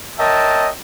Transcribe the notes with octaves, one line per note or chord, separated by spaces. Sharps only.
A#4 C#5 D#5 E5 G5 A5